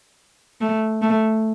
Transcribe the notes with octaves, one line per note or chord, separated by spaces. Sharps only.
A3
A3